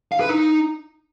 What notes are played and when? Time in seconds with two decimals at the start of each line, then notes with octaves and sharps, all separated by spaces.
0.12 F5
0.20 B4
0.29 D#4